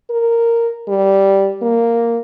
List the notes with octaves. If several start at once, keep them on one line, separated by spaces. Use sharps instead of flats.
A#4
G3
A#3